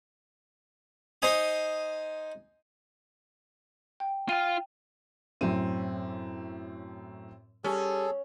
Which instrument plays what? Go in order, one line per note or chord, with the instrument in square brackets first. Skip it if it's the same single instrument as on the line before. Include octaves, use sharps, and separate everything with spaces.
[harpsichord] D#4 C5 G#5 D#6
[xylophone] G5
[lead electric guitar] F4 F5 [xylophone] G5 D#7
[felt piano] F#2 A2 D#7 [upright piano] C4
[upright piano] G3 [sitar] C#4 [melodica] G#4 A4